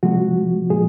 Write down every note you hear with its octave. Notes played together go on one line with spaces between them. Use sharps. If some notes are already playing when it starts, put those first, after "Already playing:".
C3 F3 G#3 F#4
A#2 F3 G#3 G#4